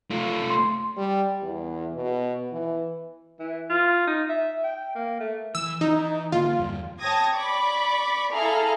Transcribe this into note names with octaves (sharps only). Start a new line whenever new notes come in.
A3 F4
C6
G3
E2
B2
E3
E3
F4
D#4
E5
G5
A#3
A3
E3 E6
E3 D#4
G#1 D3 A#3 F4
E2 G2
C#5 G5 A5 D#6 G#6 A#6
D5 B5 C#6 D6
E4 G#4 A4 F5 A#5 F6